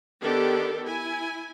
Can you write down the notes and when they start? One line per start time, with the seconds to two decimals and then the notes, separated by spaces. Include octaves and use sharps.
0.22 D#3 B3 D4 G4 A4
0.85 E4 G#5